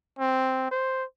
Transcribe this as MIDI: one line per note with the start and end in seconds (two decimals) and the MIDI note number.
0.19 0.70 60
0.71 1.04 72